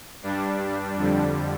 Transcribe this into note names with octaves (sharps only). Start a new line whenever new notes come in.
G2 G3 D4
F2 D3 G3